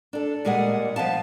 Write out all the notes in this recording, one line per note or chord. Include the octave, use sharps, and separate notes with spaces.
D4 A4
A#2 G3 G#3 G#4 F#5
F3 B3 F5 A5